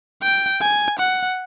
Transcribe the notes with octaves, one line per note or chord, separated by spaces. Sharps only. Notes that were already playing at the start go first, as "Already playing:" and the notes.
G5
G#5
F#5